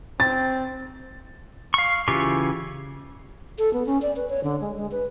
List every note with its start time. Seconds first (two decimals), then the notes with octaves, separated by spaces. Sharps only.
0.20 C4 A6
1.74 F5 C#6
2.08 C#3 E3 F4 G4 C#6
3.58 A4
3.73 B3
3.86 C#4
4.02 D5
4.16 B4
4.29 C#5
4.44 D3
4.61 G#3
4.77 G#3
4.92 B4